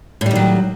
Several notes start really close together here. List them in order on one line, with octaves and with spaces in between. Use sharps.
A2 G3 D#3 F#3